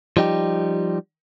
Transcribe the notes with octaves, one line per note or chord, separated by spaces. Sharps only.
F3 G3 D#4 G4